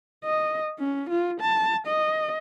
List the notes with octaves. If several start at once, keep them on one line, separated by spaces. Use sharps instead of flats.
D#5
C#4
F4
A5
D#5